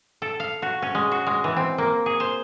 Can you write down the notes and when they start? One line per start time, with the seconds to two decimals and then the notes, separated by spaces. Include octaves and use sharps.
0.22 A4
0.40 F5
0.62 F#4
0.82 C#4
0.95 G#3
1.12 F#4
1.27 G#3
1.44 E3
1.56 C4
1.78 A#3
2.06 G#4
2.20 C5